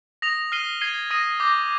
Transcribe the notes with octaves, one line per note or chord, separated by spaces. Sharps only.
D#6 A#6 F7
F6 C7 D#7 G7
G#6 C7 D#7 G7
D#6 A#6 D#7
D6 G6 A#6